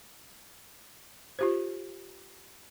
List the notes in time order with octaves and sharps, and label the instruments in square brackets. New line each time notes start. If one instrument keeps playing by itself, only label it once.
[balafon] F4 G4 C5